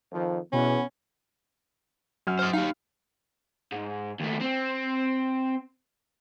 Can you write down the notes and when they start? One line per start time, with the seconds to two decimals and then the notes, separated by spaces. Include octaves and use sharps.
0.12 F2 D#3 F3
0.53 E2 B2 B3 C#4
2.27 F#2 F#3 F6
2.39 C5 D#5
2.53 D#4 G4 F5
3.72 G#2
4.20 D#2 A3
4.41 C4